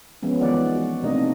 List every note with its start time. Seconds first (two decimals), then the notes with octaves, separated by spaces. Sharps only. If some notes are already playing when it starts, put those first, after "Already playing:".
0.23 F3 G#3 B3 C#4
0.41 D#3 E3 G#3 B3 D5 F#5
0.75 F#4
1.03 C3 A3 A#3 D4 D#4 D#5